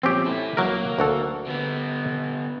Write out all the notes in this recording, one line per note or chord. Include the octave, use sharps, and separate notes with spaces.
F2 A#2 C4 C#4 G4
E4 A4
C#2 F#3 A#3 A#4
D2 F#4 A4
D3 B3